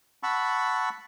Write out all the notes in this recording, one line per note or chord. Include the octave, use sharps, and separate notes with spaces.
F#5 A5 B5 C#6 E6